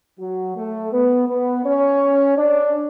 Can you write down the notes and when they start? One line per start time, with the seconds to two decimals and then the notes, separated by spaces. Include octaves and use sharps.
0.19 F#3 F#4
0.56 A3 A4
0.92 B3 B4
1.28 B3 B4
1.65 C#4 C#5
2.37 D4 D5